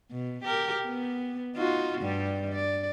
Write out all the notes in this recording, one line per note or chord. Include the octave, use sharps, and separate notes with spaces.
B2
G4 A#4
B3
D#4 F4 F#4
G2 G3
D5